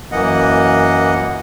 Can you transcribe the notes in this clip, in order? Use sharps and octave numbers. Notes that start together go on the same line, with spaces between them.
F#2 E3 A#3 D#5 F#5